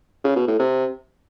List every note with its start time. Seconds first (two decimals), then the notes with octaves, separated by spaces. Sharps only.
0.24 C#3
0.36 B2
0.48 A2
0.59 C3